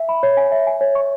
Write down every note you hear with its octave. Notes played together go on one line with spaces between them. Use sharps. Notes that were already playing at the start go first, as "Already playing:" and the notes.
Already playing: E5 G#5
B5
C#5
G#5
E5
G#5
C#5
C#6